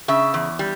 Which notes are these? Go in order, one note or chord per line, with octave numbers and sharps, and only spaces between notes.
C#3 E5
E2
G3